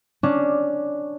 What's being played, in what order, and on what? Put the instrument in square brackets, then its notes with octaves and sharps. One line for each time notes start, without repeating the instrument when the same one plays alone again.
[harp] C#4 D4